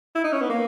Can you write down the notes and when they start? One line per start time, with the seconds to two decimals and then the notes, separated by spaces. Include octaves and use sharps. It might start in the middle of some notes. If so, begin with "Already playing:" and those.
0.15 E4
0.24 D#4
0.33 C#4
0.42 B3
0.50 A#3